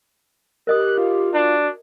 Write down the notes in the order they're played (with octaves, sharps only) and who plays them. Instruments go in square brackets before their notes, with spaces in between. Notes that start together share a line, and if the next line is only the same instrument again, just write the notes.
[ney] G4 [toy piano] A#4 D#5 D#6 [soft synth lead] F#6
[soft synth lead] F4
[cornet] D4 [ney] F#4